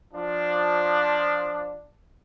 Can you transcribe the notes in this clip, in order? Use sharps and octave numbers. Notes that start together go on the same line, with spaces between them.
F3 D4